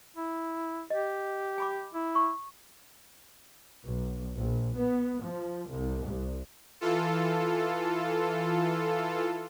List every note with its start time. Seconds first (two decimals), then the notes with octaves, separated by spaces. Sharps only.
0.16 E4
0.90 G4 D#5
1.58 G#5 B5 D6
1.94 E4
2.15 C#6
3.83 B1
4.35 A#1
4.76 B3
5.23 F3
5.67 C2
6.05 C2
6.81 E3 F4 A4